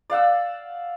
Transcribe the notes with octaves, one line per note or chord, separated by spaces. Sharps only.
D5 F5 F#5 E6